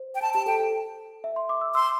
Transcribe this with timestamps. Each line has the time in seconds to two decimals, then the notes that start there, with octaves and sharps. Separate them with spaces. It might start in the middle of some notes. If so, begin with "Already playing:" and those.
Already playing: C5
0.15 G5
0.22 A5
0.34 G4 A5
0.46 A4 G5
0.60 A4
1.24 E5
1.36 C6
1.49 D6
1.61 E6
1.75 C6 E6